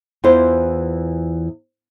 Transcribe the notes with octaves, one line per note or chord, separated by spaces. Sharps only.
E2 E3 F4 C5